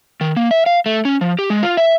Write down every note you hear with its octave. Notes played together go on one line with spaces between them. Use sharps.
D#3
A#3
E5
F5
A3
C#4
F3
G4
G#3
F4
E5